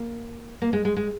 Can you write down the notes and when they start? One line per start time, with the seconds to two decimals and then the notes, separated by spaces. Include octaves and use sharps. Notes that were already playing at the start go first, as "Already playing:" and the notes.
Already playing: A#3
0.62 A#3
0.73 G#3
0.85 G#3
0.97 G#3